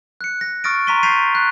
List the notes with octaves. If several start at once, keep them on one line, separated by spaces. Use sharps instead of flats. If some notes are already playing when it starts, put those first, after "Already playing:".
F#6 C#7
A#6
C#6 D#6 F6 A6 A#6 D7
A#5 C6 C#6 B6 D#7 G7
G6 A6 B6 C7 D#7 F7
F#6